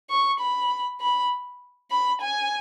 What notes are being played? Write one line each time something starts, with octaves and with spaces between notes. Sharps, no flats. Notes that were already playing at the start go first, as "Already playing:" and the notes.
C#6
B5
B5
B5
G#5